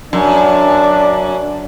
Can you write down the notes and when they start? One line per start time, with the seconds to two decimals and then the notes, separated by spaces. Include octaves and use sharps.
0.13 F#2 D4